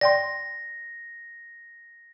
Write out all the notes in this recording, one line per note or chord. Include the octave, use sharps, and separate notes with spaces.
D5 G5 C6 A#6